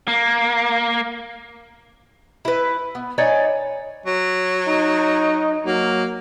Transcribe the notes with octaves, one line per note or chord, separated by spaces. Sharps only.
A#3
E4 B4
B3
D#4 C#5 D5 G#5
F#3
D#4
F#3 A#3